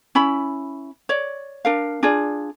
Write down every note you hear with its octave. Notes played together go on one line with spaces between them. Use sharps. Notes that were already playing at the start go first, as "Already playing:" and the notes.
C#4 E4 B5
C#5 D5
D4 A#4 F5
D4 F4 G#4 D5